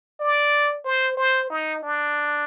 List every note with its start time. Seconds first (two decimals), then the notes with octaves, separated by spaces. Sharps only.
0.20 D5
0.85 C5
1.17 C5
1.50 D#4
1.83 D4